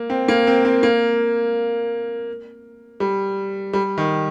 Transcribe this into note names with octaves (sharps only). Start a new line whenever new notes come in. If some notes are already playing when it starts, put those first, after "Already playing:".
Already playing: A#3
C4
A#3
C4
C4
A#3
G3
G3
D#3